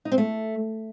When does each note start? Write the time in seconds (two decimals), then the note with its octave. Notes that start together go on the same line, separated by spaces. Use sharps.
0.05 D#4
0.12 C4
0.18 A3